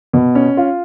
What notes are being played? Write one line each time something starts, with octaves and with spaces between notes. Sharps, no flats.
B2
C#4
F4